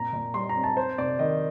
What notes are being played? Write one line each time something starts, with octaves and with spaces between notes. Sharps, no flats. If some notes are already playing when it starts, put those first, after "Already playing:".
Already playing: A#2 C4 A#5
A#2
G3 C6
A#5
C4
A5
C4 C5
C3 D5
D#3 D#5